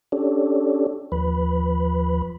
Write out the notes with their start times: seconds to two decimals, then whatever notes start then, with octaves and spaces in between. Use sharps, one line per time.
0.12 C#4 D4 G4 A4 C#5 D5
1.12 D#2 F3 B4 B5